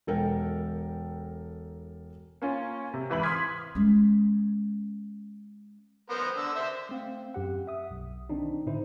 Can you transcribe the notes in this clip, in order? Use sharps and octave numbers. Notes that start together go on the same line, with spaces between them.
E1 A4 A#4 G5
A#3 C#4 F4
C3
G#1 E3 B5 F#7
C6 D6 D#6 F6 G#6 B6
G#3 C#4
B3 A#4 C5
D3 E6
C5 E5
A3 C4 F5
F#2 G4 F#5
E5 D#6
B1
D#3 C4 D4 D#4
A2 D3 D#4 E4 C5